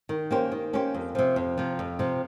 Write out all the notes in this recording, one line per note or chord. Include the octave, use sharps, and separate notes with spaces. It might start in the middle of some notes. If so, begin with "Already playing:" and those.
D#3
A#3 C#4 G4 C5
D#3
A#3 C#4 G4 C5
F2
C3 F3
F2
C3 F3
F2
C3 F3